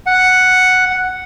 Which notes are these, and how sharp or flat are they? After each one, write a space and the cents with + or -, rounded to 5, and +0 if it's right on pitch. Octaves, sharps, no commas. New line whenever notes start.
F#5 +0